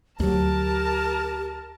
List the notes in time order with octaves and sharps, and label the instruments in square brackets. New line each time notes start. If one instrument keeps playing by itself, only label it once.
[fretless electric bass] D2 F#3 [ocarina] G4 [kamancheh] A#4 A5